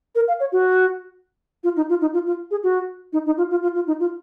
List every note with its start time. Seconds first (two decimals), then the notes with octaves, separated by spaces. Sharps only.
0.15 A#4
0.28 F5
0.40 C#5
0.52 F#4
1.64 F4
1.76 D#4
1.89 F4
2.01 D#4
2.13 F4
2.26 F4
2.51 G#4
2.63 F#4
3.13 D#4
3.26 D#4
3.38 F4
3.51 F4
3.63 F4
3.75 F4
3.87 D#4
4.00 F4